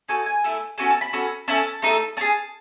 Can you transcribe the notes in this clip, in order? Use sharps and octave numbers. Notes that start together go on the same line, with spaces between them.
D#4 F#4 A4 G#5
G#5
A3 E4 A4
C#4 F#4 A4 G#5
A5
B5
C#4 F#4 A4
C#4 E4 A4 A5
A3 D#4 A4
C#4 G#4 A5